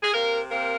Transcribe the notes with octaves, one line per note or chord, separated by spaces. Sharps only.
G#4
C3 A#3 A#4
A#3 C4 A#4